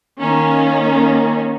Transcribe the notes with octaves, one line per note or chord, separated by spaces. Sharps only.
D#3 A#3 C#4